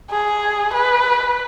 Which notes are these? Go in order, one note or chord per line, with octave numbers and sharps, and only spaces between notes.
G#4
B4